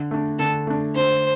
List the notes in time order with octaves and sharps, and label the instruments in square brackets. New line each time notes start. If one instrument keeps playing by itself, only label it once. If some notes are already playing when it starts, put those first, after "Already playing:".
Already playing: [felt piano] D3
A3 D4
[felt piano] D3 [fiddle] A4
[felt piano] A3 D4
[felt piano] D3 [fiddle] C5